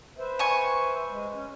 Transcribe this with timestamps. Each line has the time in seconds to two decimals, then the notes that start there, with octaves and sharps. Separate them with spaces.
0.18 B4 C5 E5
0.39 G#5 C#6
1.09 G#3
1.33 C#4